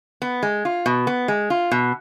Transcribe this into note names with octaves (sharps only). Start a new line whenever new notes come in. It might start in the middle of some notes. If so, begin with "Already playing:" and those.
B3
G#3
F4
B2
B3
G#3
F4
B2